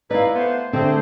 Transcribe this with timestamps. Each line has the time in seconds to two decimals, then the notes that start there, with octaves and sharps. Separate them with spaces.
0.11 D#4 E4 B4 D5 F5
0.35 A3 B3 C5
0.73 D3 A3 C4 G4 G#4 C5